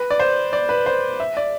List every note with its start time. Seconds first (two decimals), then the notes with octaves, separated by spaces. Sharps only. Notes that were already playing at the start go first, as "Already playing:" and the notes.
Already playing: B4
0.10 D5
0.20 C5
0.53 D5
0.69 B4
0.86 C5
1.20 E5
1.37 D5